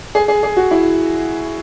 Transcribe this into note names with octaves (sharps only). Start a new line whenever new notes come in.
G#4
G#4
G#4
F#4
E4